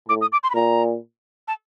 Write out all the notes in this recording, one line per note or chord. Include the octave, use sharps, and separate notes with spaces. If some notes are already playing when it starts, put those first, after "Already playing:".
A2 D6
D#6
D6
C6
B5
A#2 A#5
A5